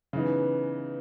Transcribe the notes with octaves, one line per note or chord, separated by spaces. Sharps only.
C#3 E3 B3 D#4